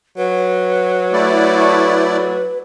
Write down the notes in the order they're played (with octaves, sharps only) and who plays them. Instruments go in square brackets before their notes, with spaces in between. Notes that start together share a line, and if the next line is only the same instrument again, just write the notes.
[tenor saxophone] F#3 [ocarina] B4
[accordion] A3 E4 D5